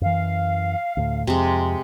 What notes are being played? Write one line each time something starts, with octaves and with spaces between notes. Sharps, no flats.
F#2 E3 F5
D2 A2
F2 C3 G#3